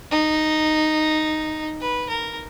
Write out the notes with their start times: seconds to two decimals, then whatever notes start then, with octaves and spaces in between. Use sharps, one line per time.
0.11 D#4
1.81 B4
2.09 A#4